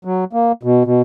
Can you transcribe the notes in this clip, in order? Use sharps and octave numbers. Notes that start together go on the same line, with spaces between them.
F#3
A#3
B2
B2